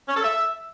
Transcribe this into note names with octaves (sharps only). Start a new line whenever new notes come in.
C#4
A4
E5